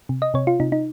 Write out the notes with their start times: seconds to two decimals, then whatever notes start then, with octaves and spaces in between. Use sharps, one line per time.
0.09 C3
0.22 D#5
0.34 C3 C#5
0.47 F4
0.60 C3 D#4
0.72 D#4